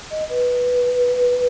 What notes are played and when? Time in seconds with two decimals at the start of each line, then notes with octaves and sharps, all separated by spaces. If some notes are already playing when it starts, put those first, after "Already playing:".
0.11 D#5
0.29 B4